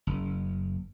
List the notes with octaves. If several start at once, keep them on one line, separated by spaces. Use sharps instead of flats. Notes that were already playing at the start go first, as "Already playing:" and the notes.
F#1